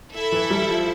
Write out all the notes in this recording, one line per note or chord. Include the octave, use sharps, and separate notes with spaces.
E4 A4 E5
E3
G3
F3